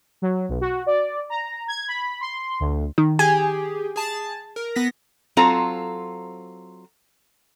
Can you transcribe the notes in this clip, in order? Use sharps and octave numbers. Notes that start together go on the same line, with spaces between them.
F#3
B1
F#4
D5
A#5
G#6
B5
C6
D2
D#3
G4 G#4 G#5
G#4 A5
A#4
B3 A#6 B6
F#3 C4 F4 A4 C5 A#5